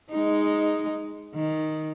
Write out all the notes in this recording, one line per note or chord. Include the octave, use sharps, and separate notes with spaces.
G#3 D#4
D#3